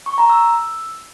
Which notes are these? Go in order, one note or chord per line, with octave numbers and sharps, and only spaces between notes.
C#6
A#5
E6